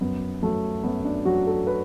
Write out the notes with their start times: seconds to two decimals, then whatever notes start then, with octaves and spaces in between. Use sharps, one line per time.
0.01 F#2 B3
0.43 F#3 A3
0.84 F#2 B3
1.04 D4
1.25 F#3 F#4
1.47 A4
1.67 B4